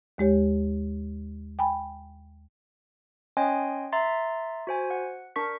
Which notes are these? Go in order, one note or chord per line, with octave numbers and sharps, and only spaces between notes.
D#2 G#3 G4 C#5
G5 G#5 B5
C#4 C#5 D#5 G5 G#5 C6
E5 A#5 C6 A6
F#4 C5 G#5
F#5
D4 A#4 C#6 B6